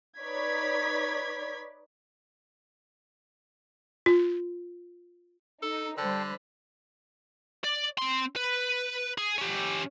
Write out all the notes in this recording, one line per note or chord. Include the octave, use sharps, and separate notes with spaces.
D#4 B4 C#5 D5 G#6 B6
F4
D#4 A4
D3 G3 A4 C5 D5 G5 B5
D5
C4 C6
B4
G#4
C#4 G4